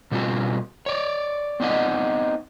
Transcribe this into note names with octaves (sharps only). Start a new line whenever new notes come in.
B2 G3 C4 F4 F#4
C#5 D5
B3 C4 D#4 D5 D#5 F#5